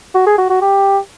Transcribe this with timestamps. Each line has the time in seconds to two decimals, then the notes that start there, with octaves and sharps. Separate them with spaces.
0.15 F#4
0.26 G#4
0.38 F#4
0.50 F#4
0.61 G4